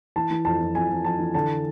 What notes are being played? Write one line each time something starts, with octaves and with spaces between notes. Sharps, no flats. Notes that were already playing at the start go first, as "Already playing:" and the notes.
E3 A5
E3
F2 A5
F2
F2 G#5
F2
F2 A5
E3
D3 A5